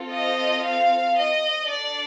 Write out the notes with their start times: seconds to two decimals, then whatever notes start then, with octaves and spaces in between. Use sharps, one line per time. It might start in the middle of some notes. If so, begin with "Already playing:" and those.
Already playing: C4 F4 A4
0.11 D#5
0.63 F5
1.15 D#5
1.67 D4 A4 D5